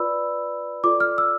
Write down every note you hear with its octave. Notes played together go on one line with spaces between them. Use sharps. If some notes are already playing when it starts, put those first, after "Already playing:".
Already playing: F4 B4 D5 B5 E6
F4 A4 D5 D6
F6
E6